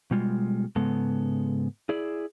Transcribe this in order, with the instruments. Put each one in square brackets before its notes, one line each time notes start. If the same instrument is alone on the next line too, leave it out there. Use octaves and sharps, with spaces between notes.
[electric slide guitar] B2 G3 G#3 F4
G#2 C#3 G#3 B3 A4
E4 G#4 D5